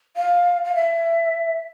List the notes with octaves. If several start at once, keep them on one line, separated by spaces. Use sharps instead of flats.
F5
F5
E5